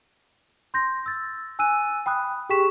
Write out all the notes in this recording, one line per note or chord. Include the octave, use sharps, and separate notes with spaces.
C6 G6 A#6
E6 A6
G#5 E6 F#6 D#7
G5 B5 D#6 F#6
G4 G#4 G5 C#6 B6 E7